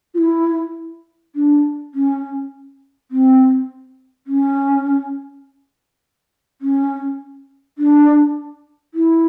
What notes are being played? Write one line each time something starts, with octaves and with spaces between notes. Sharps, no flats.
F4
E4
D4
C#4
C4
C#4
C#4
D4
E4